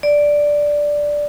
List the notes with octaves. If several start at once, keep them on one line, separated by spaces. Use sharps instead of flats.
D5